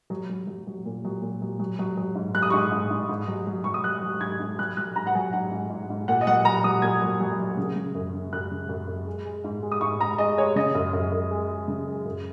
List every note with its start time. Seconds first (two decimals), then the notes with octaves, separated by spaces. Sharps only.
0.10 F#3
0.29 F#3
0.47 F#3
0.67 F#3
0.86 A#2
1.04 F#3
1.22 A#2
1.42 F#3
1.59 F#3
1.79 F#3
1.97 F#3
2.15 G#2
2.34 F#3 F#6
2.42 D#6
2.50 C#6
2.54 G#2 D#6
2.72 G#2
2.91 G#2
3.09 G#2
3.28 F#3
3.47 F#3
3.64 F#3 C#6
3.74 D#6
3.84 F#3 F#6
4.03 F#3
4.21 G#2 G#6
4.40 G#2
4.59 F#3 F#6
4.77 F#3 F#6
4.96 G#2 A#5
5.07 F#5
5.15 F#3 G#5
5.33 G#2 F#5
5.51 G#2
5.70 G#2
5.90 G#2
6.08 A#2 F#5
6.21 D#5
6.27 F#3 F#5
6.45 F#3 A#5
6.64 F#3 D#6
6.82 A#2 G#6
7.02 F#3
7.20 F#3
7.39 F#3
7.57 C#3
7.76 C#3
7.95 F#2
8.14 C#3
8.33 F#2 F#6
8.51 C#3
8.69 F#2
8.88 F#2
9.07 G#3
9.25 G#3
9.44 G#2
9.62 G#3
9.71 D#6
9.81 G#2 C#6
10.01 G#2 A#5
10.18 G#3 D#5
10.38 G#3 C#5
10.56 C#3 D#5
10.75 F#2
10.93 F#2
11.12 F#2
11.31 G#3
11.50 G#3
11.68 C#3
11.87 G#3
12.05 F#2